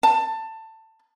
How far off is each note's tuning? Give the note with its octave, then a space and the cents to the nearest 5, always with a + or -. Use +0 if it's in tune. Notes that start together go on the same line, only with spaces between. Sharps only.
A5 +20